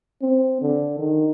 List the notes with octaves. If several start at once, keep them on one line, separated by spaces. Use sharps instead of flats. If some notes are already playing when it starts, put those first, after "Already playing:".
C4
D3
D#3